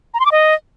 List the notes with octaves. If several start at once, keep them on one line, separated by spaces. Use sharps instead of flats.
A#5
C6
D6
D#5